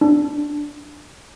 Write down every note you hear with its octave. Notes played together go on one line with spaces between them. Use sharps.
D4